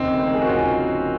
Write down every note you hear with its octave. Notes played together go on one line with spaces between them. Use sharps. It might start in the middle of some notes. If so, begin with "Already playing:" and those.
Already playing: F1 D#2 C#3 C4 D#4
C5
A#4
G#4
F#4
F1 D#2 C#3 C#4 F4